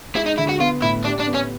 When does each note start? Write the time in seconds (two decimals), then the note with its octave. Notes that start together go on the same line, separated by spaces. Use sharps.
0.15 G#3 E4
0.26 D#4
0.38 D3 E4
0.49 F#4
0.60 B3 F4
0.82 A2 E4
1.05 D4 G4
1.20 D4
1.27 B3
1.35 C#4